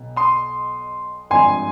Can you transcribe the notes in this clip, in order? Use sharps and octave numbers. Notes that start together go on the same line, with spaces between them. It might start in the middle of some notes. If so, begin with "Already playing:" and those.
Already playing: B1 B2
C6 D#6
G#1 G2 F3 G#5 C6